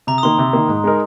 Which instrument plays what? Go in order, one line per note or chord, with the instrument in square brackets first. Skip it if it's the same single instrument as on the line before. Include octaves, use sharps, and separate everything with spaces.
[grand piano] C3 [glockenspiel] A#5
[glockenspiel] D#6
[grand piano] D#3 A#3 [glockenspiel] C6
[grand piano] C3
D#3 A#3
G#2
G#3 D#4 A#4